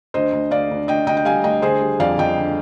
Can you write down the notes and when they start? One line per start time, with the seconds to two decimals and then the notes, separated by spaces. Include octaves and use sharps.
0.14 D2 C5 D#5
0.32 D2
0.51 D2 D5 F5
0.71 D2
0.88 D2 D#5 G5
1.07 D2 D#5 G5
1.17 G5
1.25 G3 F5 G#5
1.44 D2 D#5 G5
1.62 D3 G#4 C5
1.81 G3
1.99 F2 D5 F5
2.18 F2 D#5 G5
2.38 D3